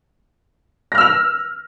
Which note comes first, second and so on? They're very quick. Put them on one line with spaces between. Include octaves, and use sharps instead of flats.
A#6 F6 E6 F7